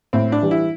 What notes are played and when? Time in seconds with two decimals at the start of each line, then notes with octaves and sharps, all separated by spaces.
0.13 A2 C4
0.32 D4
0.42 E3 G3
0.51 E4